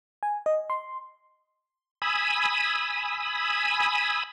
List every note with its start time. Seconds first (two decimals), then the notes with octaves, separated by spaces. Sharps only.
0.23 G#5
0.46 D#5
0.70 C6
2.02 G#5 B5 D#6 E6